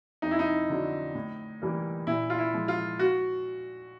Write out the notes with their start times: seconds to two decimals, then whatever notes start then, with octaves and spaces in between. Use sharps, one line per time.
0.22 F2 D#4
0.31 E4
0.39 D#4
0.69 D3 F#3
1.15 A2
1.62 E3 G3 A#3
2.07 A#2 E4
2.30 F4
2.38 E4
2.53 F3 G#3
2.68 F4
2.99 F#4